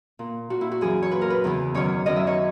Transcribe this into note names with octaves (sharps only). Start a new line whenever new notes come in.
A#2
A#2 F#4
E4
F#4
F#2 E3 G#4
C#5
A#2 B4
A#4
B4
E2 C#3 E3
F#2 D#3 C#5
F#2 D#3 D#5
E5
C#5